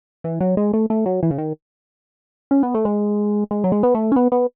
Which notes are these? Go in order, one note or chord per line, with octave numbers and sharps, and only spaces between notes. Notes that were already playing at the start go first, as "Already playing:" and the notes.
E3
F#3
G#3
A3
A3
F#3
E3
C#3
D#3
C#4
B3
A3
G#3
G#3
F#3
G#3
B3
A3
C#4
B3
B3